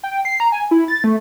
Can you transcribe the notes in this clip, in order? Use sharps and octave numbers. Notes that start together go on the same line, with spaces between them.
G5
C7
A#5
G#5
E4
A6
A3